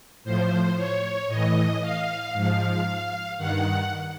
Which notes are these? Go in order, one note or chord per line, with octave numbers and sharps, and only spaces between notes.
A2 F3 C5
C#5
A2 E3 D#5
F5
G#2 F3 F5
G2 D#3 F#5